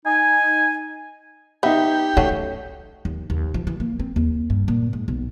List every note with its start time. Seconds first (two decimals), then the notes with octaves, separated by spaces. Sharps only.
0.05 D#4 G#5
1.63 B3 D#4 G4 E5
2.17 F#3 A3 C#4 F#4
3.05 D#2
3.30 D#2
3.54 F3
3.67 E3
3.80 A#3
4.00 C4
4.16 D#2
4.50 G2
4.68 A#2
4.93 G#2
5.08 B1